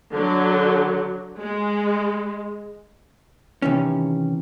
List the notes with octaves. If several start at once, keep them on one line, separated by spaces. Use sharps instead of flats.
D3 F#3
G#3
C3 D#3 E3 C#4